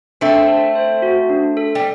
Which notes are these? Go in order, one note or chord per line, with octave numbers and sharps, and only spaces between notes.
A3 C4 D4
A4
C5
F#4
D4
A4
G3